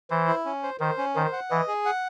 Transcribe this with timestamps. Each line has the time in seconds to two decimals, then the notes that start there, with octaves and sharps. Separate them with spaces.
0.10 E3 C5
0.28 E4
0.45 C#4
0.63 C5
0.80 D#3 C5
0.98 C#4
1.15 D#3 C5
1.33 F#5
1.50 E3 D#5
1.68 G#4
1.85 F#5